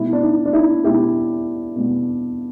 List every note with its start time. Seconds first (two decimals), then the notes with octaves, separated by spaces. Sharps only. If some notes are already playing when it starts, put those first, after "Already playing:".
Already playing: B2 G3 E4
0.13 D4
0.23 E4
0.45 D4
0.53 E4
0.84 B2 G3 E4 G4
1.76 B2 G3